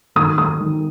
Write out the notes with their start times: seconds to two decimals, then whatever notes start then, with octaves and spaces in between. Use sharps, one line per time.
0.16 D#3 D#6
0.38 D#3 D#6
0.60 D#3